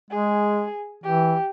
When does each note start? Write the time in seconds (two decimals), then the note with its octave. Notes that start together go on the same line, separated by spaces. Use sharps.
0.10 G#3 G#4
1.03 E3 G4